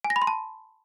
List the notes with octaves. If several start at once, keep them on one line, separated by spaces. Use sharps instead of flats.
G#5
A#6
B5
C6
A5